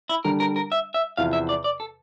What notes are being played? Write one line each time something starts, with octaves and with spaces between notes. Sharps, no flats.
E4
D3 G3 D4 A#4
A#4
A#4
E5
E5
E2 C3 F3 F5
E5
D5
D5
A4